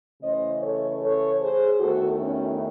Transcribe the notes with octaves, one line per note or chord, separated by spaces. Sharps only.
C#3 E3 A3 C#4 C5 D#5
A4 C#5
A4 C#5
G#4 C5
E2 D#3 A3 F#4 A4
C#4